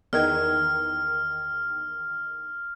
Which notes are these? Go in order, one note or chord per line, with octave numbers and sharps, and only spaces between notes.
E2 D#3 F6 G#6